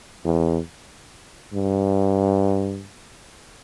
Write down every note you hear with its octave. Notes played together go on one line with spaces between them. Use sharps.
E2
G2